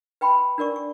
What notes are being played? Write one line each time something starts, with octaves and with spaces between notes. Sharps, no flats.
B4 G5 B5 C6
D4 A#4 D5 C#6
C#6